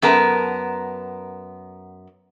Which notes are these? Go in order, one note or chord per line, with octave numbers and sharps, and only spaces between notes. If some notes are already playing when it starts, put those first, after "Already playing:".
F#2 B3 A#4 A5